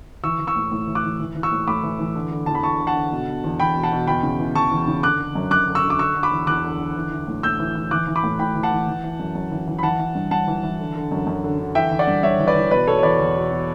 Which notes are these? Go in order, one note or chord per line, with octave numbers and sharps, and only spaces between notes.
E3 C#6 E6
E3
C#6 E6
A2
A2
E3
D6 F#6
E3
E3
E3
C#6 E6
A2
A2 B5 D6
E3
E3
D3
D3
E2 A5
B5
E2 A5 C#6
D3
F#5 A5
D3
B2
B2
E2
E2 G5 B5
B2
F#5 A5
B2
E2 G5 B5
C#3
E3
E2 A5 C#6
E2
C#3
D3 D6 F#6
D3
F#2
F#2 D6 F#6
D3
C#6 E6
D3
D6
D3 C#6 E6
D3
B5 D6
E2
E2 D6 F#6
D3
D3
E3
E3
A2
A2 E6 G6
E3
E3
E3 D6 F#6
E3
B5 D6
A2
A2 G5 B5
E3
F#5 A5
E3
E3
E3
F#2
F#2
E3
E3
B5
E3 F#5 A5
E3
G2
G2 F#5 A5
E3
E3
D3
D3
F#2
F#2
D3
D3
E3 E5 G5
E3
D5 F#5
G2
G2 C#5 E5
E3
B4 D5
E3
B2 B4 D5
B2 A4 C#5
C#5
E2 B4 D5
E2
B2
B2